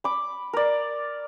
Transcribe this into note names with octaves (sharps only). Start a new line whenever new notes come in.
B5 D6
A#4 D5